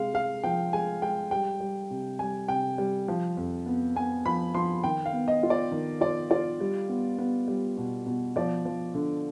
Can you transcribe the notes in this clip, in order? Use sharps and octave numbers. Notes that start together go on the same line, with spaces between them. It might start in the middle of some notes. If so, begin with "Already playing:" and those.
Already playing: C3 G#3 F5
G#3 F5
F3 G5
G#3 G#5
G#3 G5
G3 G5
G3
C3
G3 G#5
C3 G5
G3
F3
F2
B3
B3 G#5
F3 B5
F3 C6
D#3 G5
F5
B3
D#5
F4
D5
D#3
F4 D5
F4 D5
G3
B3
B3
G3
B2
B2
F3 D5
F3
D3